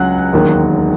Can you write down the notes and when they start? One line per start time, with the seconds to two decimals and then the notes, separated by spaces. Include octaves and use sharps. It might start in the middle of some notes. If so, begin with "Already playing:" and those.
Already playing: C#2 C#3 F#3 F#5 F#6
0.33 E1 D#2 D#3 F#3